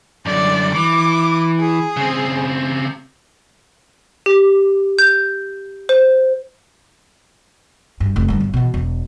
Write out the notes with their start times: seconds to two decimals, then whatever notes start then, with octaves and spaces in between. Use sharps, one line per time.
0.26 F#2 D3 D5
0.74 E3 D6
1.59 G#4
1.97 C#3 C4
4.26 G4
4.99 G6
5.89 C5
8.00 G2
8.16 F1 A3
8.28 G2 D3
8.40 G1
8.53 B2 E3
8.74 E1 B3